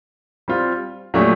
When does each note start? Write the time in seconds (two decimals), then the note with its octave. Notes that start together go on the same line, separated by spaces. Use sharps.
0.48 G3 C4 F4
1.14 A#2 F#3 A3 D4 G4